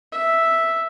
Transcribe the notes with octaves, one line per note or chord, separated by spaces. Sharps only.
E5